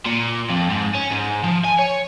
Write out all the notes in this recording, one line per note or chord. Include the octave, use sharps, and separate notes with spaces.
A#2
F2
G#2
C#4
G#2
F3
G#5
C#5